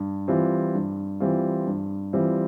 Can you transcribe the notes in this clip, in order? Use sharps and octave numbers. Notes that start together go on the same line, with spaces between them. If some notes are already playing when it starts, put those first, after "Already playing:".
Already playing: G2
E3 G3 C4 F4
G2
E3 G3 C4 F4
G2
E3 G3 C4 F4